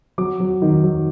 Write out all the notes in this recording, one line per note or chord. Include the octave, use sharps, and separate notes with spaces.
F#3 D6
F#3
D#3
F#3